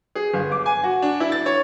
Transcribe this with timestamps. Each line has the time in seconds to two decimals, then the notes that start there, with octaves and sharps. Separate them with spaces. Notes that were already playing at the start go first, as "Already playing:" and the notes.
0.15 G#4
0.34 G1
0.52 D6
0.66 G#5
0.83 F#4
1.02 D4
1.20 E4
1.32 A6
1.46 C#5